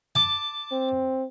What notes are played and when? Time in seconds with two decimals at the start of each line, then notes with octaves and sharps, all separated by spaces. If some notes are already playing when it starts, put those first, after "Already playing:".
0.15 A5 D6
0.72 C4